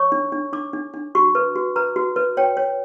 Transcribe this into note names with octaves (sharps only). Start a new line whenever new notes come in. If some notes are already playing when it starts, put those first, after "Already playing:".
Already playing: C#5 C#6
D4
D4
D4 D6
D4
D4
F#4 C#6
B4
F#4
B4 A#5
F#4
B4
C#5 G5
C#5